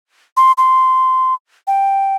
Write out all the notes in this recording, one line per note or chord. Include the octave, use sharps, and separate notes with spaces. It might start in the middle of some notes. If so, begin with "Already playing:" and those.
C6
C6
G5